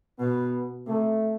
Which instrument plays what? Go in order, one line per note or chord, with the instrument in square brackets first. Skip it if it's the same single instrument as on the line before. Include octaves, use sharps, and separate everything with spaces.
[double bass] B2 [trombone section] B3
[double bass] C3 [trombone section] A3